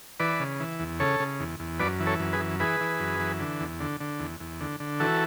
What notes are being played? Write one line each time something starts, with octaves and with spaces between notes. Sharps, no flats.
E3 B4 D5
C#3
E3
E2
C#3 A4 C#5
C#3
E2
E2
F#2 B4 D5
E3
A4 C#5
F#2
G#4 B4
E3
E3 G#4 B4
E3
F#2
E3
D3
E2
D3
D3
E2
E2
D3
D3
E3 F#4 A4